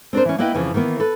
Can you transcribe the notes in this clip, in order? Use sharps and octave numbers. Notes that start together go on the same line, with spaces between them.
C4 D4 A#4 C5
E3 C#4
A#3 B3 E4 B4 D#5 G5
F2 C#3 E3 F3
D#3 E3 A#3 B3
A4 B4